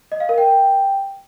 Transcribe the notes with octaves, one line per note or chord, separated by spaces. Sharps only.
D#5
F5
A#4
G5